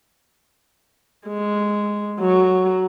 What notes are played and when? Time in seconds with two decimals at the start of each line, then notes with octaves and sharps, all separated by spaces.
1.27 G#3
2.20 F#3